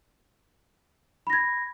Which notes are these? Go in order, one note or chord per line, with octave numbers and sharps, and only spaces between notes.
B5 G#6 A#6